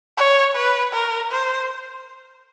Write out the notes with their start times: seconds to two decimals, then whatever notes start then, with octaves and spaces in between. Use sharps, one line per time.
0.18 C#5
0.56 B4
0.94 A#4
1.32 C5